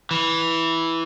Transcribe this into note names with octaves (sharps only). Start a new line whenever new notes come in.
E3